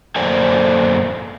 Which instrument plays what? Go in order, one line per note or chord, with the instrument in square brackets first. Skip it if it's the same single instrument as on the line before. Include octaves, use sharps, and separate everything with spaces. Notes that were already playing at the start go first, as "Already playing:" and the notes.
[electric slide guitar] F#2 A#3 A4 C5 D5 G#5